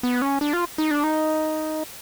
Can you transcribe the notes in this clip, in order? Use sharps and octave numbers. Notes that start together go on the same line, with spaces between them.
B3
C#4
D4
F4
D#4
D4
D#4